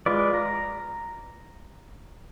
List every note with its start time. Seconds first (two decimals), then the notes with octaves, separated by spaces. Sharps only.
0.06 G#3 F4 B4 D5
0.34 A#5